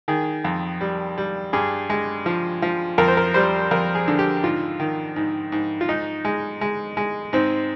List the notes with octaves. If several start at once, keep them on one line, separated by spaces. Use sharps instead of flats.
D#3 G#4
F2
G3
G3
G2 G#4
G#3
F3
F3
F2 A#4
C5
A#4
G3 C5
F2 A#4
G#4
D3
G4
G#2 F4
D#3
G#2
G#2
F4
G#2 D#4
G#3
G#3
G#3
G#2 C4